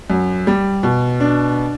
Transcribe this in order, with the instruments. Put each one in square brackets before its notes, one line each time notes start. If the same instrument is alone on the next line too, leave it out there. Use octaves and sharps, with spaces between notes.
[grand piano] F#2
G3
B2
D4